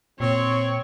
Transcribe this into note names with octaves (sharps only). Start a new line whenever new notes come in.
A#2 C4 C#5